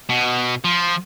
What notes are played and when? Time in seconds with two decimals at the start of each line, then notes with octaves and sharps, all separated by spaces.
0.09 B2
0.64 F3